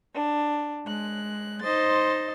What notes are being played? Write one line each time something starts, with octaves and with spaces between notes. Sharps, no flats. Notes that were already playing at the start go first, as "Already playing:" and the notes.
D4
G#3 F#6
D#4 C5 D#5 C6 A6